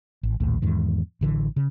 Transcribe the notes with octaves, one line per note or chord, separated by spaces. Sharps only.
A1
A#1 D#2 A2
E2 G#2 D#3
A1 D3 E3
C#3